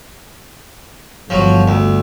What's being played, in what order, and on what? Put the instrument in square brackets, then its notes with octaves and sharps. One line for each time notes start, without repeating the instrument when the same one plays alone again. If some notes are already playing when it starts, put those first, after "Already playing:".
[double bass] G1 [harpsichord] F3 F#3
[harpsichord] D2